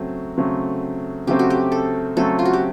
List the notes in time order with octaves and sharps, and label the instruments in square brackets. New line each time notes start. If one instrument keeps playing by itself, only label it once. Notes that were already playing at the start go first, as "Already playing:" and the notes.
Already playing: [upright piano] C#3 F#3 A3 C4
C#3 F#3 A3 C4
[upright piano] C#3 F#3 A3 C4 [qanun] G4
[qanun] F#4
G4
A4
[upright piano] C#3 F#3 A3 C4 [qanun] A4
[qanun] F4
F#4
G4